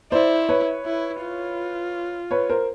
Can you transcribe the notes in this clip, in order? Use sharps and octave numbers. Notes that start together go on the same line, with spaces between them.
E4 C5 D5
B4 C#5
E4
F4
B4 C#5
A#4 C5